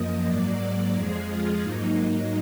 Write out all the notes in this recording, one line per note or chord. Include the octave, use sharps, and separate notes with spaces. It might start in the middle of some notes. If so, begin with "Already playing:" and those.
Already playing: F#2 F3 A#3 D#5
G#2 F#3 A#3 D5
F2 F3 G#3 G#4
F4
G#2 F#3 A#3 D#4